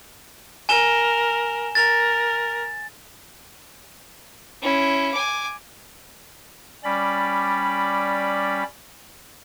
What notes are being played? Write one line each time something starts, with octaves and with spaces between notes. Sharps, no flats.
A#4 G#5 E7 G7
A#4 A6
C#4 E4
G#5 D6
G3 C#4 D5 B5